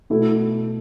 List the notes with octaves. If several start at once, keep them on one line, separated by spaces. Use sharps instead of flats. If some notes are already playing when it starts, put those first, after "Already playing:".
B2 A3 E4